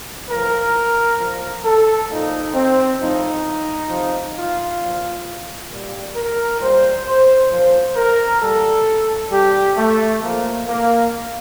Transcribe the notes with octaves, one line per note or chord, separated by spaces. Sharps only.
A2 F3 A#4
A#2 F3
A4
A#2 F3 D#4
C4
A2 F3 D#4
C3 F3
F4
A#2 F3
A#2 G3
A#4
A#2 G3 C5
C5
A#2 F3 C5
A#4
A#2 G3 A4
C3 G3 G4
A3
A#2 F3 A#3
A#3